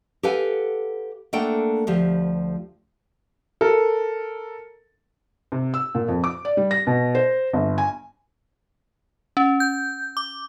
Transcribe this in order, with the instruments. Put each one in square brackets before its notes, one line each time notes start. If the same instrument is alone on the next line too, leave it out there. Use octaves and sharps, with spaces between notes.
[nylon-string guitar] G4 A4 B4 F5 F#5 G#5
A3 A#3 D4 A4 F#5 G5
D2 F3 G4
[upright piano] A4 A#4
[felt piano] C3
E6
A#2
F2
D6
D5
G3
A#6
B2
C5
G1
G#5
[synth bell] C#4
G6
D6